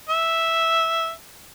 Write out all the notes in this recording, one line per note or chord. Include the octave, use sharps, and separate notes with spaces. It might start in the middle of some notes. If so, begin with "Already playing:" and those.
E5